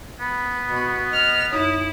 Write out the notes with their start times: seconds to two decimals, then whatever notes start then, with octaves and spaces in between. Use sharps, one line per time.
0.20 B3 B5
0.68 B2
1.12 D#5 F6
1.52 F#2 D#4 E4 C#5 D#6